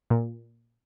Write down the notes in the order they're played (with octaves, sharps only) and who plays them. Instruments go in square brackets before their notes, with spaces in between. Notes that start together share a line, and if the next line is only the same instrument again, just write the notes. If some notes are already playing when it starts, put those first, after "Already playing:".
[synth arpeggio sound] A#2